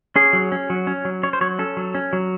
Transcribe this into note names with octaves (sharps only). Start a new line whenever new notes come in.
C#4 G#4
F#3
C#4
F#3
C#4
F#3
C#4 C#5
C5
F#3 C#5
C#4 A4
F#3
C#4
F#3